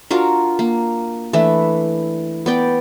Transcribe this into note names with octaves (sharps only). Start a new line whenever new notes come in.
D4 F4 F#4 A#4
A#3
E3 A3 D4 E4
B3 D5 G5